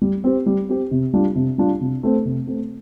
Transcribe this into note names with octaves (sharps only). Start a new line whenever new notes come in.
G3
C4 G4
G3
C4 G4
C3
G3 D4 F4
C3
G3 D4 F4
C3
A3 C4
C3
A3 C4